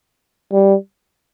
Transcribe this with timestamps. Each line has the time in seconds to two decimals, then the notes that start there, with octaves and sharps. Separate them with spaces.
0.52 G3